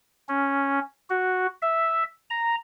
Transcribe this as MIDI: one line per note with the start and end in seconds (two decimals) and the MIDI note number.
0.29 0.79 61
1.10 1.47 66
1.62 2.03 76
2.30 2.55 82